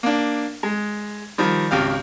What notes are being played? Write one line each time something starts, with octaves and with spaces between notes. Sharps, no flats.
A#3 D4
G#3
D#3 F3 G3
G#1 C#2 G4 F5